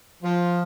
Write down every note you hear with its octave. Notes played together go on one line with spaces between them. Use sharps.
F3